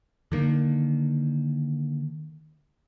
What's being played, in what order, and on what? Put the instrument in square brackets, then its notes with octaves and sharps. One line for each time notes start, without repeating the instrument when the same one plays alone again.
[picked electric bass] D3 D#3 A#3